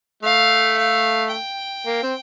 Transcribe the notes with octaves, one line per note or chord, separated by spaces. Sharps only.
A3 F5
F5
G5
A#3
C4